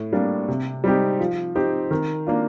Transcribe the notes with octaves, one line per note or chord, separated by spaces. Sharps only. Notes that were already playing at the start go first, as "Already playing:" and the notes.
Already playing: A2
G3 A#3 D4
C3
G3 C4 D#4 G4
F3
C4 D#4 G4
D#3
A#3 D4 F4